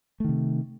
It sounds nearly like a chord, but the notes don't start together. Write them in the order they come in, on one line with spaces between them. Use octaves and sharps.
A3 D#3 C3